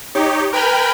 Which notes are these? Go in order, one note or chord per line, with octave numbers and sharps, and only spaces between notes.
D#4 G4 C#5
A#4 B4 G5 G#5 B5 F6